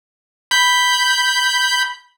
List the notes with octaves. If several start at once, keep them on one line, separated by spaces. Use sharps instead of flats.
B5 G6